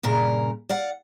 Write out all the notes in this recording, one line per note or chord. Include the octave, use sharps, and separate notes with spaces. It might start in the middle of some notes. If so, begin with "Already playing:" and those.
G2 A#2 C#3 A#4
D5 F5 F#5